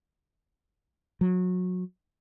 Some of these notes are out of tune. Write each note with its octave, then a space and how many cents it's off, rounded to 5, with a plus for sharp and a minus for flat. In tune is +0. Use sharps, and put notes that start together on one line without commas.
F#3 -25